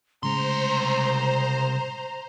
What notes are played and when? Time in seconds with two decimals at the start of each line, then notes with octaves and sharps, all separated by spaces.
0.23 C2 A2 C#3 G#3 C5 A#5 C6